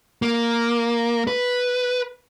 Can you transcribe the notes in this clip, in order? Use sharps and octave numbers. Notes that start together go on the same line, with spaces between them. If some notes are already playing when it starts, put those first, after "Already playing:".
A#3
B4